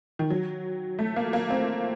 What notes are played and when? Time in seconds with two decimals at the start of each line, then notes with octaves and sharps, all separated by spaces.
0.19 D#3
0.30 F#3
0.99 A3
1.16 A#3
1.33 A#3
1.50 C4